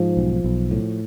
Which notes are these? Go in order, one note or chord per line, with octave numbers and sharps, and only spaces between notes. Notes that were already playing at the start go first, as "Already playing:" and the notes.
Already playing: G#2 F3
B1
B1
A2